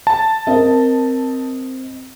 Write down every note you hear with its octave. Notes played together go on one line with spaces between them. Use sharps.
A5
C4 A#4 D#5